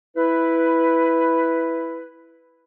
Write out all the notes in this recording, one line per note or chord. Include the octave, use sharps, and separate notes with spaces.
E4 B4